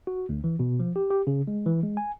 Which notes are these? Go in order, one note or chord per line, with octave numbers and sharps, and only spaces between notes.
F#4
D2
E3
B2
F3
G4
G4
C#3
G#3
E3
G#3
G#5